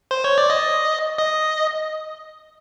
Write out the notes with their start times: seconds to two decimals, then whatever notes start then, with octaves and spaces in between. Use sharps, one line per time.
0.11 C5
0.24 C#5
0.38 D5
0.50 D#5
1.18 D#5